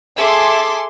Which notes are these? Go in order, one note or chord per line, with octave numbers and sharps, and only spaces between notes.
G#4 A4 E5 C6 D6